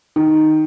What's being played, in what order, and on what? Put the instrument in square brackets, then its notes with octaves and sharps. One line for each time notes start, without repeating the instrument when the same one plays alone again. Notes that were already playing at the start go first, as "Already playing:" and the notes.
[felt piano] D#3